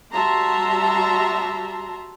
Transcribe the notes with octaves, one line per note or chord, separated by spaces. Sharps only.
G3 F#4 E5 A5 A#5 C6